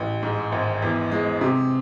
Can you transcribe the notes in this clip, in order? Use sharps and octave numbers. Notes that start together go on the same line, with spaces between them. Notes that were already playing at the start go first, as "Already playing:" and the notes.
Already playing: A1
G#2
G#1
E2
G#3
C3